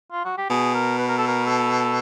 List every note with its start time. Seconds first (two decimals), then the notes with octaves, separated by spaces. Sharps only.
0.12 F4
0.25 F#4
0.37 G4
0.50 B2 G#4
0.74 A#4
0.98 B4
1.08 A#4
1.18 A4
1.28 A#4
1.46 A4